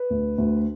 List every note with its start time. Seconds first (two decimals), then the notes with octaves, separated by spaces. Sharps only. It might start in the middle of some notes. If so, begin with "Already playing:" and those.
Already playing: B4
0.10 D2
0.38 D2